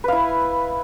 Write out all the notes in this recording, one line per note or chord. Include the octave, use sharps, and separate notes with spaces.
E4 B4 F5